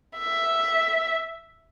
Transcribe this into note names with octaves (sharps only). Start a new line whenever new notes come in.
E5